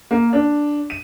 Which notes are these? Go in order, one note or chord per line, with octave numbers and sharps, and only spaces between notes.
A#3
D4
D#7